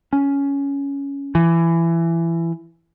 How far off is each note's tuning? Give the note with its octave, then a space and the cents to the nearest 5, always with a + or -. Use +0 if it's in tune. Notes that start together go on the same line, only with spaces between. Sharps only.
C#4 +10
E3 +20